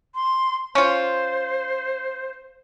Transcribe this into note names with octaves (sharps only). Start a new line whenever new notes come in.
C6
C#4 F4 C5